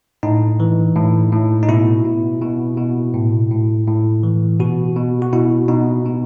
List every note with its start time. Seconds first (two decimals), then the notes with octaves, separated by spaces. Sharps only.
0.23 A2 D#4
0.60 E3
0.96 A2
1.32 A2
1.63 D#4
1.69 B2 E4
2.05 B2
2.42 B2
2.78 B2
3.14 A2
3.51 A2
3.87 A2
4.23 E3
4.59 B2 F#4
4.96 B2
5.22 F#4
5.33 B2 E4
5.68 B2 D#4
6.06 B2